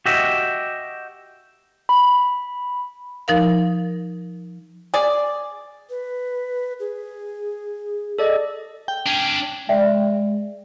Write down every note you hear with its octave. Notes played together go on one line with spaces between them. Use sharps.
F#4 G4 D#5 E5
B5
F3 D#4 A#4 F5
G#4 D5
B4
G#4
G#4 A4 D5 D#5
G5
C#4 D4
G#3 D5 E5 G5